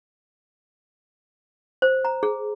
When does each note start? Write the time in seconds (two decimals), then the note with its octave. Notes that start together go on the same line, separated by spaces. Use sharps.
1.82 C5
2.05 A#5
2.23 G#4